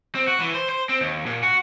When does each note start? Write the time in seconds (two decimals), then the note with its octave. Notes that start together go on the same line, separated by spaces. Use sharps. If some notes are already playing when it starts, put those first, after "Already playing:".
0.15 C4
0.27 F#4
0.40 E3
0.54 C5
0.69 C5
0.89 C4
1.01 D#2
1.26 A#2
1.43 F#4